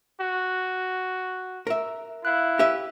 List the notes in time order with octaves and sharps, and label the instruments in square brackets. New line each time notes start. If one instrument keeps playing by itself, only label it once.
[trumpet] F#4
[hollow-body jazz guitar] A#4 E5
[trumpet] E4 [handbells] F5 F#6
[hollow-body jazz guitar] G4 B4 E5